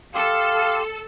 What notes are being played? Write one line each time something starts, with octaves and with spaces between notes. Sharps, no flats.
G4 A4 F5 C6